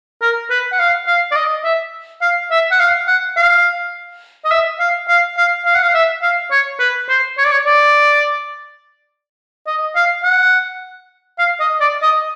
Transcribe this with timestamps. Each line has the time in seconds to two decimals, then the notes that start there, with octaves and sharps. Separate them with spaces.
0.22 A#4
0.50 B4
0.72 F#5
0.80 F5
1.07 F5
1.32 D5
1.36 D#5
1.64 E5
2.22 F5
2.51 E5
2.72 F#5
2.80 F5
3.08 F#5
3.37 F5
4.45 D#5
4.51 E5
4.80 F5
5.08 F5
5.38 F5
5.66 F5
5.75 F#5
5.83 F5
5.95 E5
6.22 F5
6.51 C#5
6.80 B4
7.09 C5
7.38 C#5
7.45 D5
7.52 C#5
7.66 D5
9.67 D#5
9.96 F5
10.24 F#5
11.39 F5
11.60 D#5
11.81 D5
12.03 D#5